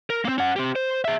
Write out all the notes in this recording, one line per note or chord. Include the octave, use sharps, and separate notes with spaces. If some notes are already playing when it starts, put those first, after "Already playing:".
A#4
A#3 C4
C#4 F#5
C4 G4
C5
G#4 E5